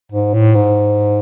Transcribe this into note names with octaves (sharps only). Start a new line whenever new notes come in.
G#2
A2
G#2